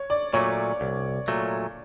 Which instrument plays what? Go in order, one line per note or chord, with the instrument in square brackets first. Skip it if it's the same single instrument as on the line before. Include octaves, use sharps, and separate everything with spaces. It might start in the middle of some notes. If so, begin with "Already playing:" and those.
Already playing: [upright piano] C#5
D5
[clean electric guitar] A#2 F#3 A3 [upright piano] C#5
[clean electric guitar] C2
A#2 F#3 A3